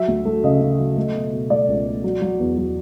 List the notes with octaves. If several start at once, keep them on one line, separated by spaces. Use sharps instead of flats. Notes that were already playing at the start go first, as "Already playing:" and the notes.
Already playing: F#3 E5
D2
A3
C#3 D#5
C#3
F#3
A3
B2
B2
A3 D5
C#2
A3
F#3
F#3
E2
F#3